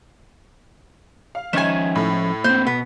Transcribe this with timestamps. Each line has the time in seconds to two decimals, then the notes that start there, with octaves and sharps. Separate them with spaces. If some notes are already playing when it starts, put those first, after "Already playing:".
1.35 F5
1.53 D#3 F3 C#4 E5 G#5 G#6 E7
1.95 A2
2.44 A#3 C4 C5
2.67 B2 B3